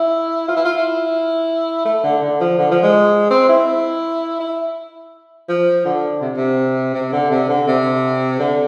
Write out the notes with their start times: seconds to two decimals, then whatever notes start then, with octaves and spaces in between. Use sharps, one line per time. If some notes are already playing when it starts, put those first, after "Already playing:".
Already playing: E4
0.48 F4
0.56 E4
0.65 F4
0.77 E4
1.85 A3
2.04 D3
2.22 D3
2.41 F3
2.58 D3
2.71 F3
2.83 G#3
3.31 C4
3.49 E4
4.40 E4
5.49 F3
5.85 D3
6.22 C3
6.36 C3
6.94 C3
7.13 D3
7.30 C3
7.49 D3
7.67 C3
8.40 D3